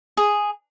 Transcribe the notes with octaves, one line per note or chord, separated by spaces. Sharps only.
G#4